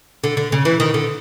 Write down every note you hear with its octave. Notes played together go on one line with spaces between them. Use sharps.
D3
D3
C#3
E3
D#3
D3